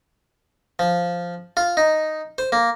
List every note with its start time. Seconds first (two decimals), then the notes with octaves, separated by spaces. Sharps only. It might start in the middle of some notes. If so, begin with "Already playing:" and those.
0.79 F3
1.57 F4
1.77 D#4
2.38 C5
2.52 A#3